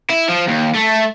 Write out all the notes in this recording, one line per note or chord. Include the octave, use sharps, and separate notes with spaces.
E4
F3
D#2
A3